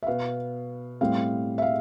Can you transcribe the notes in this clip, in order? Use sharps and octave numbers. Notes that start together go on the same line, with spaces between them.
E5
B2 B3 F5
A2 G3 C4 F5
E5
F5